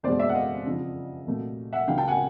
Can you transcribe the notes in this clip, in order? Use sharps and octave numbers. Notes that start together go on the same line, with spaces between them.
F#1 E2 B2 G#3 C5 D5
D5 E5
F#5
D#5 F5
F2 C#3 F3
C2 A#2 F#3 A3
E5 F#5
C#2 C#3 F#3 A#3 F5 G5
G5 A5
F#5 G#5